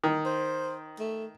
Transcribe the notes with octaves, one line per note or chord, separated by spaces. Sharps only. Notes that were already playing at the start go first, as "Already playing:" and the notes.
D#3
C5
A3